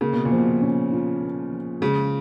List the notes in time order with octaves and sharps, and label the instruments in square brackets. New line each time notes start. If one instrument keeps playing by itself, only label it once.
[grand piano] C#3 [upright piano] A#3
[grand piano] B2
A#2
[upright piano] F3
[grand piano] B2
[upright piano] C#4
F4
A#3
F3
[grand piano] C#3 [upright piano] G#3